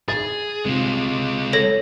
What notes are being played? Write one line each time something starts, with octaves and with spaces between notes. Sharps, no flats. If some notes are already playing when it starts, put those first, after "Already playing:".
G#4 A6
C3 G#3 F4
A4 C#5 A#6